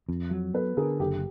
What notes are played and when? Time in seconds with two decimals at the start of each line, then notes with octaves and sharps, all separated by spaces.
0.09 F2
0.31 F#3
0.54 B3 A4 B4
0.77 D3 G#4 A#4
1.00 F#1 G4 A4